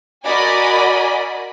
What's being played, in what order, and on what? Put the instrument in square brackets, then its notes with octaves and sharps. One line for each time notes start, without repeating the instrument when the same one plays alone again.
[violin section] F#4 A#4 D5 D#5 G#5 B5